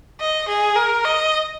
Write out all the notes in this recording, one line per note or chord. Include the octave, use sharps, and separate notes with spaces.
D#5
G#4
A#4
D#5